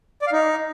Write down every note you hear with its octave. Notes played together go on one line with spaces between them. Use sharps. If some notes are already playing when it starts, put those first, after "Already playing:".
D5
F5
D#4